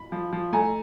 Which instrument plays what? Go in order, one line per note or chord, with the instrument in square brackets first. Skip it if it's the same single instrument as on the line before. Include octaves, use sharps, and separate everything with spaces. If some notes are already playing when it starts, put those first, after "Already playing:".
Already playing: [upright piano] B5
[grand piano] F3
F3
[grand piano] A3 [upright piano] G#5 A#5